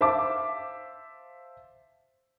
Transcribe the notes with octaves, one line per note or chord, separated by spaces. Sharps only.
C5 E5 F5 A5 D6